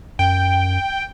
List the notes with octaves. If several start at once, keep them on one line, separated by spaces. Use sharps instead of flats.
F#2 G5